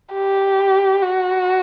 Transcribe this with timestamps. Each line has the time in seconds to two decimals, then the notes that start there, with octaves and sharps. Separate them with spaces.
0.14 G4
1.02 F#4